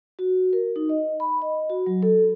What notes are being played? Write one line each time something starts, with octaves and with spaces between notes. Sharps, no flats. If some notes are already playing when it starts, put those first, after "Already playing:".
F#4
A#4
D#4
D#5
B5
D#5
F#4
F#3
A4